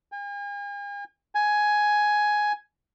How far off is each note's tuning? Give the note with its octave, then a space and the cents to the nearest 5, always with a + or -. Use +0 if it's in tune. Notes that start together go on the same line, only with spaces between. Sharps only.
G#5 -45
G#5 +10